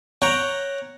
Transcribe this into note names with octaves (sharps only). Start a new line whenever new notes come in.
C#5 F#5 G5 A#5